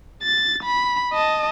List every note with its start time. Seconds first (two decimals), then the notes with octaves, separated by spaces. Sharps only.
0.23 A6
0.63 B5
1.13 D#5 A5